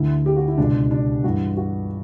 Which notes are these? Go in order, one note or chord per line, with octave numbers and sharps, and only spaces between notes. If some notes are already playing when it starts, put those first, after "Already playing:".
Already playing: D2 D3 E4
G4
F#4
E4
C#2 B2 D4
D4
G2 E3 F#4
F#4